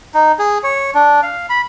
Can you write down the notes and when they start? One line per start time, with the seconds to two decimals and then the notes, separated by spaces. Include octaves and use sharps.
0.14 D#4
0.39 G#4
0.63 C#5
0.94 D4
1.23 F5
1.50 B5